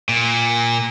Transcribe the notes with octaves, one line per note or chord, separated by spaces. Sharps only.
A#2